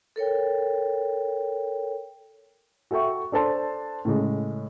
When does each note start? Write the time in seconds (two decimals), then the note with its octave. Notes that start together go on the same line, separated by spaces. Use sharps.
0.16 A4 A#4 C#5 G5
2.91 F#4 A4 E5 G5 C#6
3.32 D4 A4 C5 A5 C6
4.05 A2 C#3 G#3